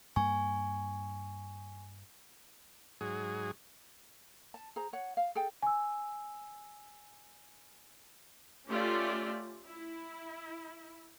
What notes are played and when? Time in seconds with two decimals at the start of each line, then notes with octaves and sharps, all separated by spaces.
0.16 G2 A#3 G#5 C#6
3.01 G#2 F#3 G#4
4.54 A5
4.76 G#4 C5 A#5
4.93 C#5 F#5
5.17 F5
5.35 G#4 A4 G5
5.62 G#5 E6
8.67 A3 C#4 F4 G4 D5 E5
9.67 E4